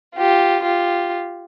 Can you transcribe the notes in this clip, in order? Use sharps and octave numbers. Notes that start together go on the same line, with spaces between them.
F4 G4
F4 G4